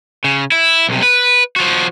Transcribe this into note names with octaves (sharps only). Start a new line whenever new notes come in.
C#3
E4
B1 C3
B4
F3 F#4